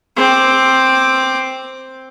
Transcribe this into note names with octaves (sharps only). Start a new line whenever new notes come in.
C4 D6